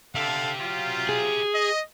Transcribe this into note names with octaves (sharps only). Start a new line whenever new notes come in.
D3 G4 A4 E5 F5
F#3 F4
G#4
D#5